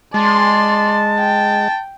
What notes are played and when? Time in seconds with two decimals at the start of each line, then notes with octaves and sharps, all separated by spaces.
0.14 G#3 D5 A5 C6
1.19 G5